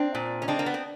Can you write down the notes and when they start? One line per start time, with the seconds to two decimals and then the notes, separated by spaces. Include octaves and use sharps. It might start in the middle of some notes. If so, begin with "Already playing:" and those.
Already playing: C4 D4
0.15 A#2
0.42 C#4
0.48 G#3 C4 D4
0.59 A#3
0.66 B3
0.74 C4